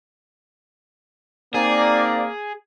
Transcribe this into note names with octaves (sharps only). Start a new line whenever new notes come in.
A#3 C4 D#4 G#4 D5